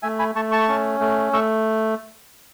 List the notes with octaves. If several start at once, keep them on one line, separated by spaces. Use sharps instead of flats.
A3 E5 G#5
G#5 B5
A3 A5 C#6
A5 C#6
C#4
A3
A3 C#6 E6